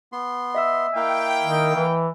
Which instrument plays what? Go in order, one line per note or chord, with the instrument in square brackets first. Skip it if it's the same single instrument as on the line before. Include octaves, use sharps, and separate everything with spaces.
[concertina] B3 C6
[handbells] D#5 E5 E6
[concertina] A#3 E4 F5 [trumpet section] G5
[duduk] D#3
E3